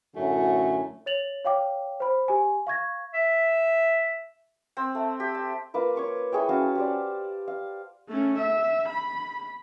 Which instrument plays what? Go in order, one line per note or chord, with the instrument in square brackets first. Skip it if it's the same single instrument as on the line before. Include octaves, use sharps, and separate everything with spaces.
[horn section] F#2 A2 D3 A3 F#4 G#5
[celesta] C#5 A6 F7 F#7
C#5 F5 G5 D6
C5 B5
G4 G#5
F5 C#6 G#6 A#6
[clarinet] E5
[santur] C4
A3
G4
A5
A#3 F4 B4 D6
C#5 C#6 D6
E4 G#4 C#5 G5
C#4 F#4 F5 A5
G4 C5 D5
F5
[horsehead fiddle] A3 C#4
E5
B5